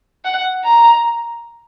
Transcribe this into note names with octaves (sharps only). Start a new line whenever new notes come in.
F#5
A#5